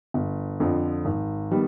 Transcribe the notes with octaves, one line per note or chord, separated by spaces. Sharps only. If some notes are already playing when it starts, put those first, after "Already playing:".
G1
F2 D3 F3
G#1
D#3 G3 B3